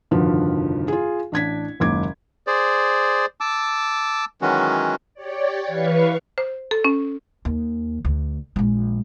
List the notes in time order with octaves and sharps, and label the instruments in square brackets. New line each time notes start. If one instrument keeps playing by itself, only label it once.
[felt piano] F1 G2 D3 D#3 F3 F#4
F4 G#4
A1 D4 G#6 B6
F#1 D#2 G#3 D6 G#6
[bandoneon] G#4 C5 D5
A5 D6 E6
D#3 E3 F#3 G#3 C#4 F#4
[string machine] G4 C#5 D5
E3 B4 F5 C#6
[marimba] C5
A4
C#4
[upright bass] D#2
D2
A#1 G#3